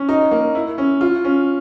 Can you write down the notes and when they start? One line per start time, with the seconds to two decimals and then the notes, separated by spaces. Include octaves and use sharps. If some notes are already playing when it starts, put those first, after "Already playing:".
Already playing: C#4
0.09 D#4
0.31 A#3
0.55 E4
0.78 C#4
1.01 F4
1.24 C#4